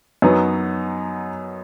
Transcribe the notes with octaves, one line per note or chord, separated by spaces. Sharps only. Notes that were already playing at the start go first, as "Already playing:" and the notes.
F#2 F#3 B3 D#4